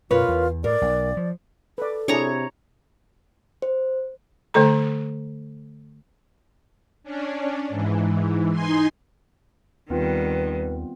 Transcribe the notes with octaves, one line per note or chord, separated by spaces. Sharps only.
F#2 B2 F4 A#4 B4 C#5
E2
A2 A#4 D5
B1
F3
A4 B4 D5
C3 D4 E4 G#4 C#5 A#5
C5
D3 A3 A4 A#5
C#4 D4
G#2 E3
D#4 G#5 C6
D#2 D#3 G3 B3 C4 F4 B4